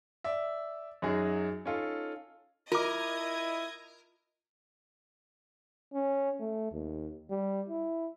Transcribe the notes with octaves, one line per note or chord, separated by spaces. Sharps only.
D5 E5
F#2 F#3 D#4 G#4
C#4 D#4 F4 A4
E4 F4 A#4 D#5 D6 D#6 G#6
C#4
A3
D#2
G3
E4